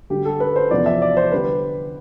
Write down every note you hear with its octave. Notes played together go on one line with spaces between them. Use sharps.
D2 D3 G3 G4
A4
B4
C5
E2 C3 F3 B3 D5
E5
D5
C5
D3 G3 B4